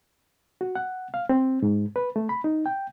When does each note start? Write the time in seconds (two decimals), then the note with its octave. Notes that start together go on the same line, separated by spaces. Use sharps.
0.61 F#4
0.75 F#5
1.14 F5
1.29 C4
1.62 G#2
1.96 B4
2.16 A3
2.29 B5
2.44 D#4
2.66 G5